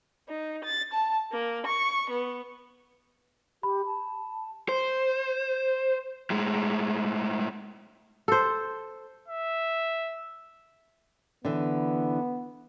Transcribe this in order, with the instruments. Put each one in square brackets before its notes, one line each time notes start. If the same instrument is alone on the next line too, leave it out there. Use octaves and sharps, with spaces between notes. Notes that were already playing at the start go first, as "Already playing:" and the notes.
[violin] D#4
A6
A5
A#3
C#6
B3
[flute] G4 [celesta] B5
[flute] A5
[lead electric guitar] C5
A2 G#3
[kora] A4 C5
[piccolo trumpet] E5
[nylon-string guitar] D3 E3 [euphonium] B3